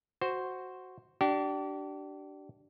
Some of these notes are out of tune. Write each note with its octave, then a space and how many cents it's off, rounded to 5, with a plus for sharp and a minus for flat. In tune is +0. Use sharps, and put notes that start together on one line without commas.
F#4 +0 C5 +0
D4 +0 G4 -35